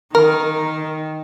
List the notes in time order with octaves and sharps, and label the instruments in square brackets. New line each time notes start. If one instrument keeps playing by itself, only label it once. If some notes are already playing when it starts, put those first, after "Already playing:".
[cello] D#3 [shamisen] A#4